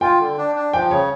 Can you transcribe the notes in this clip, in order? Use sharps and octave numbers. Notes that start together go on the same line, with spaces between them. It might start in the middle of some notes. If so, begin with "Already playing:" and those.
F4 G5
D3
D4
D4
F3 G5
C#3 C#5